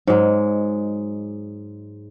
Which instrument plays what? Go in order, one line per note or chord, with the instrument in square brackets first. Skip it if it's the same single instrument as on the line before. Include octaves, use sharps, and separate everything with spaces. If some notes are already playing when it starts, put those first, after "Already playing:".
[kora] G#2 F#3 G#3